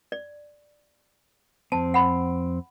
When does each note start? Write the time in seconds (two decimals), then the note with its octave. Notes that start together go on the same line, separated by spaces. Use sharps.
0.12 D5
1.72 F2 C4 A5
1.94 F#5 B5